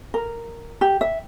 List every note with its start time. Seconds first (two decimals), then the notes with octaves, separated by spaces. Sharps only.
0.14 A#4
0.81 G4
1.01 E5